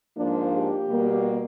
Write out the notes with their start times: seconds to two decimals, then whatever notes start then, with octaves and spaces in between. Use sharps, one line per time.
0.16 G#2 F3 A#3 D4
0.53 G4
0.88 B2 G3 A#3